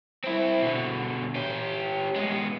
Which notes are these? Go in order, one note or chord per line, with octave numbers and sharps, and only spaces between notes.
C4 E4
B2 D3
C#4 G4
G#3 B3